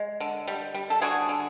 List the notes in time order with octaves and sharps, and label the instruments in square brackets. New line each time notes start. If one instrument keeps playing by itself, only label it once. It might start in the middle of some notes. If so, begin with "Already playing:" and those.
Already playing: [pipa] G#3
D3
G3
G3
A4
D3 F#4 G#4
D3